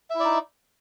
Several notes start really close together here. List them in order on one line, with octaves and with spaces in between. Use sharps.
E5 E4 D5 D#4